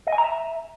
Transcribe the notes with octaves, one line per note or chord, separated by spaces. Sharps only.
D#5
G#5
A#5
E5